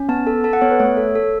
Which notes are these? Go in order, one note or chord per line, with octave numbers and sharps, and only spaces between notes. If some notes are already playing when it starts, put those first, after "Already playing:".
Already playing: C#4
B3 A5
A4
A4 A5
F#5
B3 C#5
B4
A3 C#5
A4
A4